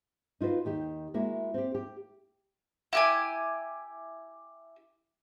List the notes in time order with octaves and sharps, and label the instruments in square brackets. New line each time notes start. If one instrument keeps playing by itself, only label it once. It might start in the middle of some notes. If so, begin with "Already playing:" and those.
[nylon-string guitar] D#4 F4 F#4 B4
D#2 D#3 G4
G#3 A#3 E4 F#4
C4 G4
G4
[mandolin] E4 G4 G#5